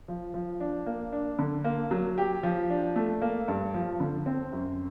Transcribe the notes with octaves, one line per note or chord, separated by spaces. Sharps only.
F3
F3
D4
A#3
D4
D3
A#3
F#3
G4
F3
D4
A3
A#3
G2
F3
D3
C4
F#2